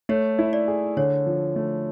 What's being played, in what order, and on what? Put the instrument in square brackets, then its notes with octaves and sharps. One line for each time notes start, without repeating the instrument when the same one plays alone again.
[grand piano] A3 [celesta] C#5
[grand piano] E4
[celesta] D5
[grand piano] G#4
[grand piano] D3 [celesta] C#5
[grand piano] F3
A3